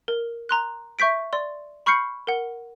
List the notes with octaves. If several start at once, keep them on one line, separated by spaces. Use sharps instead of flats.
A#4
A#5 C6 F#6
E5 C#6 G6 B6 D7
D5 C6
B5 C#6 F6 G6 C7 C#7
A#4 F#5